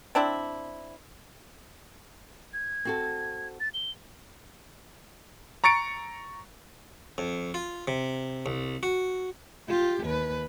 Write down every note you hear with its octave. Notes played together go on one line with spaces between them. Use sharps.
C4 D4 E4
G#6
C4 F#4 A4
A6
G7
A#5 C#6 A6 C#7 D7
F2
F4
C3
C2
F#4
F4 G4
D#2 B4